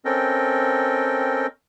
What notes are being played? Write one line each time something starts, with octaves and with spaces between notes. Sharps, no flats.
C4 C#4 A4 A#4 D#5 G5